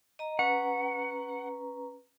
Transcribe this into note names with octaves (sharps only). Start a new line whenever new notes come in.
D#5 A#5
C#4 B4 F#5 A#5